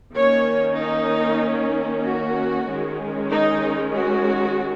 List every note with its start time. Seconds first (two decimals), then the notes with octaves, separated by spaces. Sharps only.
0.15 D#3 A#3 C#4 C#5
0.78 D#4
2.04 F#4
2.67 D#3 G#3 C#4
3.30 D#4
3.94 F#4